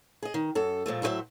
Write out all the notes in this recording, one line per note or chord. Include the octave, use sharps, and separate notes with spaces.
G#4 D#5
D#3
F#2 A4
A#2 F3 G#3 A3
A2 F#3 G#4 C5 E5